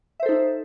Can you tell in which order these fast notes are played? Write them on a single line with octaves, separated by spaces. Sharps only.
E5 C5 A4 D#4